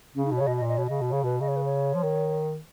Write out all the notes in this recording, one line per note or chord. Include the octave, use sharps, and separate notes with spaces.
C#3 C#4
D#4
B2
C#5
C#3
B2 D#5
D#5
A#2
D#5
B2 C#5
C#3 D#5
B2
C#3 C#5
B2 B4
C#3 D#5
C#5
B4
C#5
F3
D#3